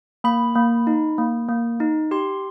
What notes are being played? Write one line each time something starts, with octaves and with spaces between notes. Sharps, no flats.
A#3 B5
A#3
D#4
A#3
A#3
D#4
G4 C6